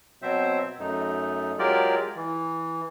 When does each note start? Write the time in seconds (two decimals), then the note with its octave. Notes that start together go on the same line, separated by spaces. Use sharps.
0.22 B2 F#3 C4 C5 E5
0.79 F#2 A3 D#4
1.59 F#3 G#3 F4 G4 A#4 D5
2.16 E3